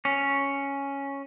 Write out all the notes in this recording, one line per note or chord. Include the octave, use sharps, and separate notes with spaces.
C#4